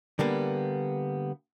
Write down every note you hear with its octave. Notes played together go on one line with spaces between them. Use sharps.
D3 G3 A#3 B3